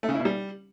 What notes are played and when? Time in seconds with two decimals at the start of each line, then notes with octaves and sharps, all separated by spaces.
0.03 A3
0.09 C#3
0.14 E4
0.20 B2
0.25 G3